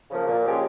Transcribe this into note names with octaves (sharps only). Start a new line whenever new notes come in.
C#3 F3 A#3
A#2
F3 G#3 C#4 G4